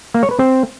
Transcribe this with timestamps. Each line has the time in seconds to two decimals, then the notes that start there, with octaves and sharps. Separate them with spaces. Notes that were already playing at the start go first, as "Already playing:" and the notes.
0.14 A#3
0.23 C#5
0.31 B4
0.39 C4